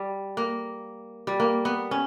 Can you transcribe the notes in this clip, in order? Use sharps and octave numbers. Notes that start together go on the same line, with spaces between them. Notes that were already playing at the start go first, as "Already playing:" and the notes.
Already playing: G3
A#3
G3
A#3
B3
C#4